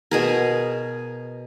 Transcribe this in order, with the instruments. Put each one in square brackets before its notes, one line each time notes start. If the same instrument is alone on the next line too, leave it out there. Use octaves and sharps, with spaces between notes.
[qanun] B2 G#4 A#4